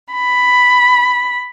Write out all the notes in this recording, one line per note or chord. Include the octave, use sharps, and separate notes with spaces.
B5